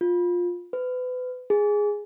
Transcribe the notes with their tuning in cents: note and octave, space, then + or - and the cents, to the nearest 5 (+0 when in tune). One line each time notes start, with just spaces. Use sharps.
F4 +15
B4 +30
G#4 +0